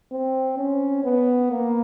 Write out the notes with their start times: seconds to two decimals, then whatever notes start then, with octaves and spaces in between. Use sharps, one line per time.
0.12 C4
0.58 C#4
1.04 B3
1.51 A#3